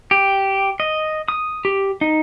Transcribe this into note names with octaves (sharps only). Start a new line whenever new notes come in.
G4
D#5
D#6
G4
D#4